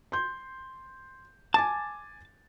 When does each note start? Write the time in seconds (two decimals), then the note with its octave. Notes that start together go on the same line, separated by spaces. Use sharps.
0.12 C6 G6
1.54 G#5 A5 D6 A6